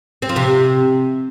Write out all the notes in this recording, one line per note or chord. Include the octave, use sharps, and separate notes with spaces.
C4
F3
C3